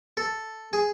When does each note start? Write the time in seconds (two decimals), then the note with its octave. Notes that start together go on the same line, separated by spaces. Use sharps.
0.17 A4
0.73 G#4